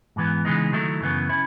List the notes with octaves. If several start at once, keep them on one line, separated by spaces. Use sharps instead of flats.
G#2 E3 B3
C#3 E3 G#3 B3 D#4
D#3 F#3 A3 E4
F#2 C#3 E3 B3
C#4 E4